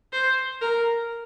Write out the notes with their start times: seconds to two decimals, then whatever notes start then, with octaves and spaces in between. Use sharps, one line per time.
0.13 C5
0.61 A#4